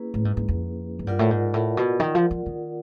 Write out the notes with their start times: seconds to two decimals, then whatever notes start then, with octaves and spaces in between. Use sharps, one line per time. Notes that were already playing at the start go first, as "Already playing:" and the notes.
Already playing: A#3 C#4 E4 G#4 B4
0.14 A2
0.25 G#2
0.37 G#2
0.48 F2
0.99 G#2
1.07 G2 F4 A#4 D5 F#5
1.19 A2
1.31 G#2
1.54 A2
1.77 B2
2.00 D#3
2.15 F3
2.31 F3
2.46 D#3